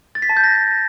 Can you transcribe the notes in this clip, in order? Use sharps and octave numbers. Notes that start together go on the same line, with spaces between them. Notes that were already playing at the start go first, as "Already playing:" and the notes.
A6
B6
A5
G6
A#6